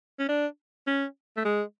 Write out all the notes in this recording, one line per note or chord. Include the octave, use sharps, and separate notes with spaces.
C#4
D4
C#4
A3
G#3